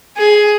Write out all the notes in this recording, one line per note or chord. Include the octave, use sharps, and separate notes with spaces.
G#4